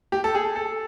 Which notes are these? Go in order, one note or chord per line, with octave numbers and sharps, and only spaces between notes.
G4
A4
G#4
A4